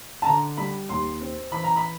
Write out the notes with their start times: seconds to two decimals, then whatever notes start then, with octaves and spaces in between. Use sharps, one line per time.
0.22 A5
0.26 D3 A#5
0.57 G3 B5
0.89 D#2 C6
1.20 C4
1.52 E3 B5
1.64 A#5
1.76 B5